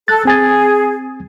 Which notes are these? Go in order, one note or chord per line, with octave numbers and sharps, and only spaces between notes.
A4 F#6 A6
C4 G#4 G#5 A6